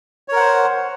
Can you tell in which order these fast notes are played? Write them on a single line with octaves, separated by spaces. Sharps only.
C#5 A#4 F#5 C5